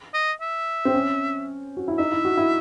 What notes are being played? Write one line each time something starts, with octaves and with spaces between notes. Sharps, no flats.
D#5
E5
C4
C#4
F#4
E4
D#4 E5
E4
F#4
E4